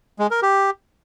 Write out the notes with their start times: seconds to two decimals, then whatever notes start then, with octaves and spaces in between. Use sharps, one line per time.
0.19 G#3
0.31 A#4
0.42 G4